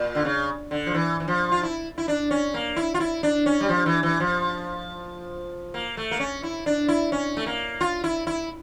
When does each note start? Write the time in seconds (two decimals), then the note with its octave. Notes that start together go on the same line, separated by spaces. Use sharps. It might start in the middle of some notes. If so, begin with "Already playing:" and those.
Already playing: A#2
0.15 D3
0.25 C#3
0.71 D3
0.86 F3
0.95 E3
1.20 E3
1.28 F3
1.52 F4
1.63 E4
1.98 E4
2.08 D4
2.31 C#4
2.54 A#3
2.76 E4
2.94 F4
3.00 E4
3.23 D4
3.46 C#4
3.60 G3
3.69 F3
3.86 E3
4.03 E3
4.20 F3
5.74 A#3
5.97 A3
6.11 A#3
6.20 C#4
6.43 E4
6.66 D4
6.88 E4
7.12 C#4
7.37 A3
7.46 A#3
7.81 F4
8.04 E4
8.27 E4